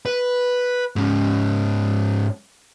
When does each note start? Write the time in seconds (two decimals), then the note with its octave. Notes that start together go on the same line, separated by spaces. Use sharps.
0.06 B4
0.96 G#2 C#4